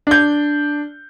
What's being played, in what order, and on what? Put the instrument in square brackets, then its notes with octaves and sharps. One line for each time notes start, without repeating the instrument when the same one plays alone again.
[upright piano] D4 G6